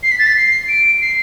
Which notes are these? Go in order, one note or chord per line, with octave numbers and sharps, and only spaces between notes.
C7
B6
A6
B6
C7
D7
C7